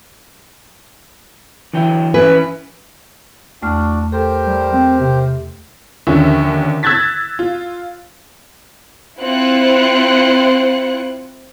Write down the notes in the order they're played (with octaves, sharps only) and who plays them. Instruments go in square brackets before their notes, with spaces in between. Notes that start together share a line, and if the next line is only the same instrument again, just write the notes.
[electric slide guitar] D3 F#3 G5 [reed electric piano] E3 E4
[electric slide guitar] C#4 E5 G#5 [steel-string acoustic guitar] B4
[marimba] E2 A3 F6 [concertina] D4 F#4
[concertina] G4 A#4 C5 [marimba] A4
[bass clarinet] G3
C4
C3
[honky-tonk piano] D#2 D3 F3 C#4 E5
E6 F#6 G#6 A6 B6
F4
[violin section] C4 E4 F4 C5 F#6 C#7